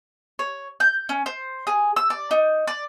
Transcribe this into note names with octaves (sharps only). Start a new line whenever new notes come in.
C#5
G6
C#4
C5
G#4
E6
D5
D#4
D5